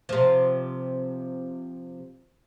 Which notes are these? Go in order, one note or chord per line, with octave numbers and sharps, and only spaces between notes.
C3 F3